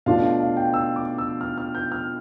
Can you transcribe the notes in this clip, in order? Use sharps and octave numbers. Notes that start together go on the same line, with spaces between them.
B2 A3 D4 F4 F5
F5
F5
G5
E6
D6
E6
F6
F6
G6
F6